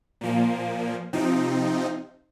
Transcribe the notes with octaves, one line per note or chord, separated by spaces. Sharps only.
A#2 F3 A#3
C3 F3 C4 D#4